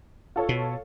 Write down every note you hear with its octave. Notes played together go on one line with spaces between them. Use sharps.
F4 A4 C#5
B2